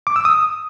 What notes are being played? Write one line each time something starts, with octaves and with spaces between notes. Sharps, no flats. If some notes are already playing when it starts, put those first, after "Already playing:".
D6
E6
D#6